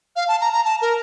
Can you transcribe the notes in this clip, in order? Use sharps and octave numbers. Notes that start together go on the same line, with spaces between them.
F5
A5
A#5
A#5
A5
A#4